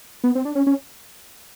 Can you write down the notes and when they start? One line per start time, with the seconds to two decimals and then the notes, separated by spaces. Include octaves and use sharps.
0.24 B3
0.35 C4
0.45 D4
0.55 C#4
0.67 C#4